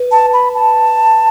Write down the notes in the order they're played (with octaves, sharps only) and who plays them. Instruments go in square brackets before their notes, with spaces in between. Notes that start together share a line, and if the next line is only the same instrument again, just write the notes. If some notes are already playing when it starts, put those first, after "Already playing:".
Already playing: [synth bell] B4
[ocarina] A5
B5
A5